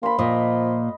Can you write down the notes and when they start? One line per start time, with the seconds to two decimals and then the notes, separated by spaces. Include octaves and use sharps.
0.03 A#3 B5 C6
0.19 A#2 F3 D#5